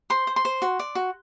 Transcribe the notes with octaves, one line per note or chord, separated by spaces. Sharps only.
C5 C6
C5
C6
C5
F#4
D5
F#4